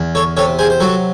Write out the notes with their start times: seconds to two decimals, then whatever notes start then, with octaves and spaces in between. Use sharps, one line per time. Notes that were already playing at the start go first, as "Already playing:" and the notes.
Already playing: E2
0.15 A4 C#5
0.37 C3 A4 C#5
0.59 G#4 C5
0.70 C5
0.80 F#3 F#4 A4